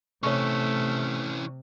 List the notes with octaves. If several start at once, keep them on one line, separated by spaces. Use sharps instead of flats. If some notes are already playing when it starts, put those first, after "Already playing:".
C3 E3 A3 C#4 C#5 C#6